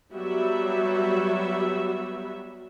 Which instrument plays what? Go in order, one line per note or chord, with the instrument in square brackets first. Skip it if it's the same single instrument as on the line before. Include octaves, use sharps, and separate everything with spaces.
[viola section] F#3 G3 B3 F#4 E5